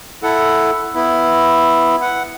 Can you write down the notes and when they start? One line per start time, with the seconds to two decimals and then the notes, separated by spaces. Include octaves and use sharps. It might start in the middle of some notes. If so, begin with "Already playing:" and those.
0.23 E4 A4 F#5
0.94 B3 E4
2.01 F#5